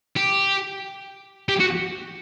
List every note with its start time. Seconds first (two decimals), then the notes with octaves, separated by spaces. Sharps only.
0.16 G4
1.49 G4
1.60 F#4